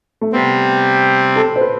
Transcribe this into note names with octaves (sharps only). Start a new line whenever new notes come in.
A3
C3 G3 B3 C4
A4
C5
B4